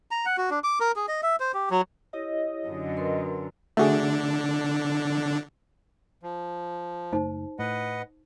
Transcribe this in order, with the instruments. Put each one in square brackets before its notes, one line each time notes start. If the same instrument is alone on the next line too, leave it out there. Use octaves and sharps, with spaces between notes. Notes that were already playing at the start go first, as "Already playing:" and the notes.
[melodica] A#5
F#5
F#4
D4
D6
A#4
G#4
D#5
E5
C5
G4
F#3
[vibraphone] E4 G4 C#5 [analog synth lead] D#5
[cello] F#2 D3
[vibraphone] A#4 B4 C6
[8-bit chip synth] D3 D4 [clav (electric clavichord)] A3 F#4 G#4
[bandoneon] F3
[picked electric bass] F#1 A3 [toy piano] D#4 C5 A5
[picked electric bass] A2 [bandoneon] B4 D#5 F#5